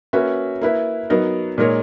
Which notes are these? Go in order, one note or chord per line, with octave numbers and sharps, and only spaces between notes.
A#3 C#4 F#4 B4 E5
A#3 E4 B4 E5
F#3 B3 D#4 A#4
A#2 G#3 D#4 A#4 C#5